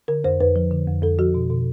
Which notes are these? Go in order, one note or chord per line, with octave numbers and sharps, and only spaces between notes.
D3 A#4
F2 C5
F2 B4
F3
D3
F2
F2 A4
F3 F#4
B2
B2